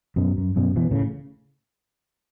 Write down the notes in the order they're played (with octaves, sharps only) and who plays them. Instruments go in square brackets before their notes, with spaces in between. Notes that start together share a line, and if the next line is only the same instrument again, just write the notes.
[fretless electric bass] F#2 B2
F#2
F#2 B2
B2 E3
A2 C#3